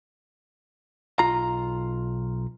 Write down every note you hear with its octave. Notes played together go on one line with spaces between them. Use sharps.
B1 F4 A#5